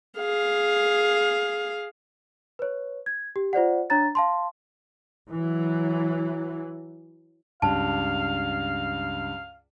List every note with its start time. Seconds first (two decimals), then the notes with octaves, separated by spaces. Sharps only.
0.18 G#4 F5
2.59 B4 C#5
3.06 G#6
3.36 G4
3.53 F4 C5 D5 F#5
3.90 D4 C#5 A#5 A6
4.15 F5 A5 C6
5.30 E3 F#3
7.62 C#2 G2 F5 A5